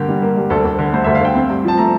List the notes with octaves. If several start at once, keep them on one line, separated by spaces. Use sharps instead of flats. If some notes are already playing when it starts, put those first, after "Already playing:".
Already playing: G2 D3 A#3 G4
G3
A#3
G2
D2 A4
D2
D3
A3 C5
D2 E5
F5
D2 G5
C4
G2
F3 A5
A3 A#5